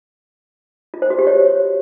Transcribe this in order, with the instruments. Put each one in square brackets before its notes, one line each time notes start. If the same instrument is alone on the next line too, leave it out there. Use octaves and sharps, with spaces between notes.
[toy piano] F4
C5
F#4
G4
C#5